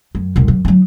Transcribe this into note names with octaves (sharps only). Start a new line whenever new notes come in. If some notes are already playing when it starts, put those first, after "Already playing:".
F#2
E1 C2
F#2
F#3 D#4